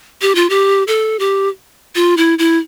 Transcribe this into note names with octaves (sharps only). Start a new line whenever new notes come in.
G4
F4
G4
A4
G4
F4
E4
E4